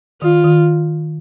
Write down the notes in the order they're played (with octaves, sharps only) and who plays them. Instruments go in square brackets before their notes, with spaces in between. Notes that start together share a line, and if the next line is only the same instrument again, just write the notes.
[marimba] D#3 [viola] F4
[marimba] D#3